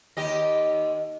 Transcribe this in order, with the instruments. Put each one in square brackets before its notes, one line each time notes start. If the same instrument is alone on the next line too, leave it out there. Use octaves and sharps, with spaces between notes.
[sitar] D#2 G4 D#5